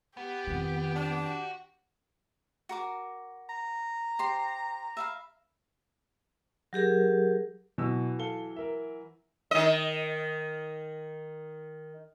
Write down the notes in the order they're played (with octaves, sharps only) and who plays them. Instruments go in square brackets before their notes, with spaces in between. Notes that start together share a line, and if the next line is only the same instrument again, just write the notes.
[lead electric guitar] B3 [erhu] G4
[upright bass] F2 D#3
[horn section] D4
[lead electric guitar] F#4
[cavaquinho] F#4 A#4 D6
[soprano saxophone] A#5
[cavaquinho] G4 C5 C6
E5 F5 B5
[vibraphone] F#3 G4 G#4 A#4
[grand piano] B2 E6 [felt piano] E3 F#3
[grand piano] A4 F5 G7
A#4 E5
[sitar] D#3 D#5